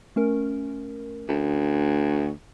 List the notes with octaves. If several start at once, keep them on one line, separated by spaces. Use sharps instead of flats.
A3 C#4 A#4
D2